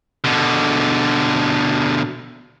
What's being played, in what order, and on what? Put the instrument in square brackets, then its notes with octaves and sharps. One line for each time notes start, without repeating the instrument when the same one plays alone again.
[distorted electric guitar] B2 D3